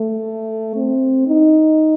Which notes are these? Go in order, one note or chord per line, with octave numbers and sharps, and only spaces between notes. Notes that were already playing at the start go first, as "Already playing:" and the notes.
Already playing: A3
C4
D#4